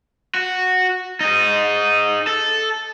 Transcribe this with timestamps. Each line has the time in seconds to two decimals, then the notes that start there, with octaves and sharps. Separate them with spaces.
0.35 F#4
1.21 D#4 G#4
2.27 A4